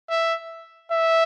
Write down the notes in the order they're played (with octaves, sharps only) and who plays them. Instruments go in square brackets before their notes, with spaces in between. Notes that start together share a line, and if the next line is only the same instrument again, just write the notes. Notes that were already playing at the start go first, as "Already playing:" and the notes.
[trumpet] E5
E5